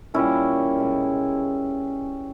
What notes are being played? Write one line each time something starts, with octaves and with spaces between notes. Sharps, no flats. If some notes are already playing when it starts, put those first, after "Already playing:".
A#2 G3 C#4 E4
B2 G#3